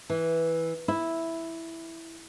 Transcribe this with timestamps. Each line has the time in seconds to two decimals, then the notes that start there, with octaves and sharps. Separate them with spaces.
0.10 E3
0.88 E4